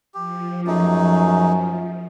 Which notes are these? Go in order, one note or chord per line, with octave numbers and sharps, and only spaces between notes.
F3 G4
F#2 A3 D#4 G#4